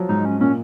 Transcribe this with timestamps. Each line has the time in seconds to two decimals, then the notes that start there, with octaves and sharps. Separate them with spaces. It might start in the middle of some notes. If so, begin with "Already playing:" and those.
Already playing: F3 F#3
0.09 G#2 D#4
0.25 C#4
0.40 A#2 C#4